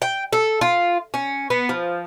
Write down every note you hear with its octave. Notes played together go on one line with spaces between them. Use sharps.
G5
A4
F4
C#4
B3
F3